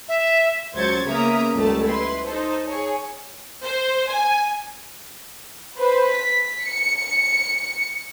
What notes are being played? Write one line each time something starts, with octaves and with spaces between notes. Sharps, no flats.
E5
C#2 F#3 C5 G#6 A6 C#7
C#3 A#3 B3 E5 A#5 D#6
C#2 F#2 G3 A3 A5
E4 B4 C6
D#4 A4 C5
G#4 C#5
C5
G#5
B4 C5
B6
C#7